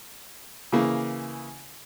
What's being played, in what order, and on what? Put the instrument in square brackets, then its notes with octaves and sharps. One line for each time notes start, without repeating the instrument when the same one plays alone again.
[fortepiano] C#3 E3 A#3